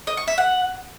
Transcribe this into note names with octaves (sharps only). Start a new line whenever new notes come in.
D#5
C#6
E5
F#5